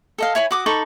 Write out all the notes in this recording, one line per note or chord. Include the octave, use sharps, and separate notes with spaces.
A4 D#5 F5
E4 C#5 G#5 B5
F#4 D6 D#6
D#4 A4 B5 C#6